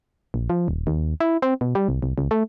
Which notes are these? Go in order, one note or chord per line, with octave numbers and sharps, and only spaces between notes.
A#1
F3
D#1
D#2
E4
C4
B2
G3
C2
C2
C#2
A3